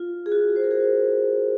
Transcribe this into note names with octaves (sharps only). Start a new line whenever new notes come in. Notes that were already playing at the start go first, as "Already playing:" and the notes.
Already playing: F4
G#4
F#4
C5
A#4
G#4